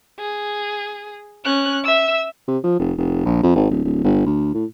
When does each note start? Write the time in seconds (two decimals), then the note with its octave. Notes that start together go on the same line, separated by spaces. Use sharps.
0.19 G#4
1.45 C#4 F#6
1.84 E5 E6
2.48 C3
2.64 F3
2.79 F1
2.98 F1
3.25 A#1
3.43 F2
3.56 G#1
3.70 D1
3.85 D1
4.04 G1
4.26 D2
4.54 A2